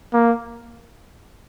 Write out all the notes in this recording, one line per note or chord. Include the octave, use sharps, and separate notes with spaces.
A#3